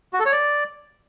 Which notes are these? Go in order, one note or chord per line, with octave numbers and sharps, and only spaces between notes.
F#4
A4
C#5
D5